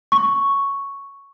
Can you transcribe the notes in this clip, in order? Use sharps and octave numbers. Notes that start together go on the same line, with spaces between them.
C#6